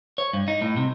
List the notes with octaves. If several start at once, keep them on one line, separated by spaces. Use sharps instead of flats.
C#5
G2
D#4
A2
C3